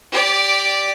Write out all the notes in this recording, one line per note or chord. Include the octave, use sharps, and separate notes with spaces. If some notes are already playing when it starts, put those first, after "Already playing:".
G4 D5